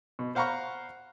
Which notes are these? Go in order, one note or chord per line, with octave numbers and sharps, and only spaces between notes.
B2
C5 F5 F#5 A#5 B5 C#6